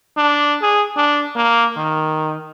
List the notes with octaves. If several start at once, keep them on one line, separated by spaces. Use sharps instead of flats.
D4
G#4
D4
A#3
D#3